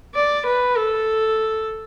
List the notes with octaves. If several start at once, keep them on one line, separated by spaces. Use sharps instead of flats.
D5
B4
A4